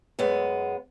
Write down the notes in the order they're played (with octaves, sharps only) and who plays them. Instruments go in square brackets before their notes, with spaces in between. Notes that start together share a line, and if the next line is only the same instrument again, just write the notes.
[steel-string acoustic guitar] F#2 G#3 B3